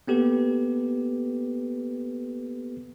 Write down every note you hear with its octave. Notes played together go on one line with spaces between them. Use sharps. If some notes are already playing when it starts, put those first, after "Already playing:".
A#3 B3 G4 A4 B4